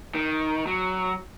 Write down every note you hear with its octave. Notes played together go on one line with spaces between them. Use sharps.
D#3
F#3